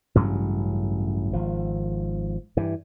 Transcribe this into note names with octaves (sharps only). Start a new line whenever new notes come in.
A1 G2 C#3 F#3
G#1 F3
G2 E3